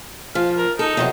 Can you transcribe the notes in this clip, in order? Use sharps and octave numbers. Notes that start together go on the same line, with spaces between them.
F3 F5
A#4
D#4 A4
E2 C3 F#3